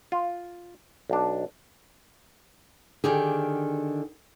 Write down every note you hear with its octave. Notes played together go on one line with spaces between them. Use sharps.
F4
B1 D4
D3 D#3 G4 G#4